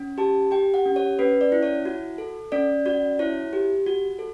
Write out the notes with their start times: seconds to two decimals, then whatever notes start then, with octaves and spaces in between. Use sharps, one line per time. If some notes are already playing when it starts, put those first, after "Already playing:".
Already playing: C#4
0.18 G4 A5
0.51 G4 G5
0.74 F#5
0.86 C#4
0.96 C#5
1.19 C#4 B4
1.41 D5
1.52 E4
1.63 C#5
1.85 F#4
2.18 A4
2.52 C#4 D5
2.86 F#4 D5
3.19 E4 C#5
3.53 G4
3.87 F#4
4.19 A4